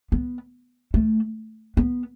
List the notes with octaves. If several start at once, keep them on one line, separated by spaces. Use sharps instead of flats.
B3
A3
B3